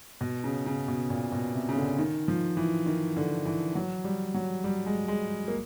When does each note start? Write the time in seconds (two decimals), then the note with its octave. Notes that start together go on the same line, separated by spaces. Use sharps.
0.21 B2
0.44 C#3
0.66 C#3
0.88 B2
1.10 A#2
1.32 B2
1.54 C3
1.69 C#3
1.76 D3
1.98 D#3
2.28 F3
2.57 E3
2.86 D#3
3.16 D3
3.45 E3
3.75 F#3
4.04 G3
4.34 F#3
4.64 G3
4.86 G#3
5.08 G#3
5.48 A#3